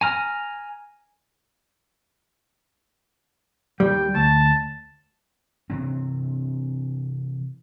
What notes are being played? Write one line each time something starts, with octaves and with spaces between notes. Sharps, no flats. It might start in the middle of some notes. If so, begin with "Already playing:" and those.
G#5 A#5 F6
D#2 G3 G5
D2 A5
C3 E3 C4